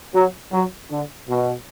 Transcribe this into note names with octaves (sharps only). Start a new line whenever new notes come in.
F#3
F#3
D3
B2